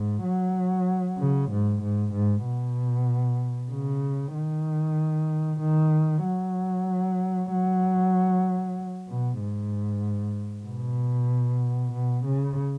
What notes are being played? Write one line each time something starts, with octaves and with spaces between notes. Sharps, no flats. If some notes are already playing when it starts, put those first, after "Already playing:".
Already playing: G#2
F#3
C#3
G#2
G#2
G#2
B2
C#3
D#3
D#3
F#3
F#3
B2
G#2
B2
B2
C#3